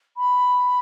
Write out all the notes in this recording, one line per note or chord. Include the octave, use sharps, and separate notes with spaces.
B5